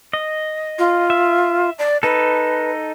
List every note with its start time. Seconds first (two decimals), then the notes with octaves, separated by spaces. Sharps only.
0.13 D#5
0.79 F4
1.10 E5
1.79 D5
2.03 D#4 A4 B4